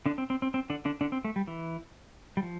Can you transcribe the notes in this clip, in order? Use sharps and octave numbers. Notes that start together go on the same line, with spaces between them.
D3 D4
C4
C4
C4
C4
D3 D4
D3 D4
D3 D4
C4
A3
G3
E3
G3
F3